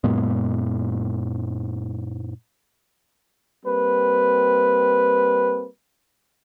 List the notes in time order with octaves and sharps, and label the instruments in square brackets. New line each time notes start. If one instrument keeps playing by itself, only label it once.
[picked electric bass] F#2 A#2 G#3 B3
[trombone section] G3 A#3 C4 B4